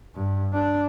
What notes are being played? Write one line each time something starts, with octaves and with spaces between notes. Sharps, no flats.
G2
D4